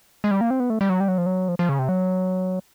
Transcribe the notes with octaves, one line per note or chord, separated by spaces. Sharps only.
G#3
G3
A#3
C4
B3
A3
G3
F#3
G3
F#3
F3
F#3
F3
F3
C#3
C3
F#3